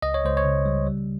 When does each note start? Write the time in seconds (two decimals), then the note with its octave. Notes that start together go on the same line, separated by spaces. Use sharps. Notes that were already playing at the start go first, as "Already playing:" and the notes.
0.02 C#2 D#5
0.14 C#5
0.23 C#2 C5
0.37 C#5
0.45 C#3
0.66 G3
0.86 G3